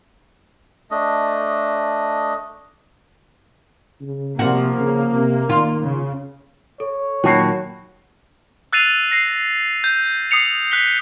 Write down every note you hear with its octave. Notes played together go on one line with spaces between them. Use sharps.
A3 D4 D#5
C#3
C3 F3 A#3 F#4
C#3
C3
D#3 F4
C#3
A4 C#5
A#2 D#3 F#3 F#4 G5 A5 B5 C7
E6 F#6 A6 C7 D#7 F7
A#6 C7
G6
D#6 C7 C#7 F7
F#6 B6 G7